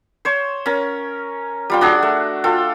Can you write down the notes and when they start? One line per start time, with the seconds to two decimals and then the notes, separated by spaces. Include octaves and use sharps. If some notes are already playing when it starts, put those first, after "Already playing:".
0.25 C5 C#5
0.66 C#4 A#4
1.70 G3 F4 G5
1.81 D4 F#4 G#4
2.03 A3
2.44 F4 A4 G5